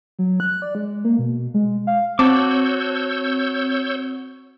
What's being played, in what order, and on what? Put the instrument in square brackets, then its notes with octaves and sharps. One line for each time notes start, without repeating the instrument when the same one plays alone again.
[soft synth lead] F#3
F#6
D5
G#3
A#3
B2
G#3
F5
[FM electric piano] C4 [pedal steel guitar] F#4 A5 D6 [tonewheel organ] C#5 E6 G6